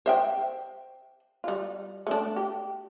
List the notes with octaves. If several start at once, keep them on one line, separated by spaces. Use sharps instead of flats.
C5 E5 G5
G3 F4
A3 D4
G4